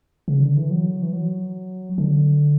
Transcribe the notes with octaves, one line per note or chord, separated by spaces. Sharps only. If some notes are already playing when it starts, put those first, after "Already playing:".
C#3
D3
E3
F#3
E3
F#3
D3